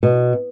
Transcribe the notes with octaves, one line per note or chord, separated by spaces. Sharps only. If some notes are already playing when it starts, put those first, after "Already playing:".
B2